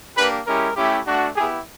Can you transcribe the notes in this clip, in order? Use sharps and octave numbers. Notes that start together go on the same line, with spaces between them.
A#3 D4 G4 B4
G#3 C#4 E4 G4 A#4
A3 C#4 E4 G4
A3 D4 F#4
B3 E4 G4 G#4